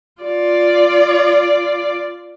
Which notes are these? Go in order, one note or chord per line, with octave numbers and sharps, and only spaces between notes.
F4 D5